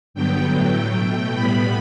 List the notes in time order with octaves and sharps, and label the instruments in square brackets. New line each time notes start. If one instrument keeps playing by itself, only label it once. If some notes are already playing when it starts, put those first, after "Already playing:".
[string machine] G2 D3 F#3 B3 G5
A2 F#3 A3
B2 A3 G5
A2 G3 B3 B5